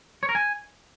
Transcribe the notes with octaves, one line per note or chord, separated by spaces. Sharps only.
C#5
A#4
G#5